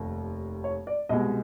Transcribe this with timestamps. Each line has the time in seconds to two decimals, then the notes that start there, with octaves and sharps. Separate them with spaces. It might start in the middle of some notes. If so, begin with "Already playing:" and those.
Already playing: F1 D#2
0.64 C#5
0.87 D5
1.09 C2 B2 G#3 D#5